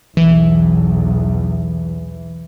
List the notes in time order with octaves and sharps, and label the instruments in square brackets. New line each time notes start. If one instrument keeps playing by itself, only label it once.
[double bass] B1 E2 [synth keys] E3